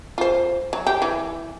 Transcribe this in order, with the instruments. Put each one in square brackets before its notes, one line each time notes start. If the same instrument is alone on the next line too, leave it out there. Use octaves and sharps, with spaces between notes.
[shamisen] F4 C5
F#3
G4
E3